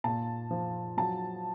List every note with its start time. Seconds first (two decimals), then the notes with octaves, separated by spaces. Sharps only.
0.04 A#2 A5
0.51 F3
0.97 F#3 A5